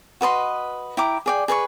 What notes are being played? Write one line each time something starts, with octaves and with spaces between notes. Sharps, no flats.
F#4 B4 D#5 C6
E4 G5 A#5 D6
G#4 D5 G5
G#4 B4 A5 C#6